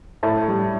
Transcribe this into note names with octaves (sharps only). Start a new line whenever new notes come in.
A2 A5
G3